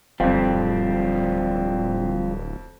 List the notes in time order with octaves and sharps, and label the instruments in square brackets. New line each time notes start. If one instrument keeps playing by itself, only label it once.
[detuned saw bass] D1 [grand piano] F2 F5 [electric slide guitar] F3 G3 C4